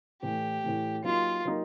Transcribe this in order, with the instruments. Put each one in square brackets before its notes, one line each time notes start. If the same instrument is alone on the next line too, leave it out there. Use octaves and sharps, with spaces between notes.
[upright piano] A2 E3 A3 [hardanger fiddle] G4
[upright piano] A2 E3 A3
[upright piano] F#3 A#3 D#4 G4 A#4 [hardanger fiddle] F4
[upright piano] F#3 A#3 D#4 G4 A#4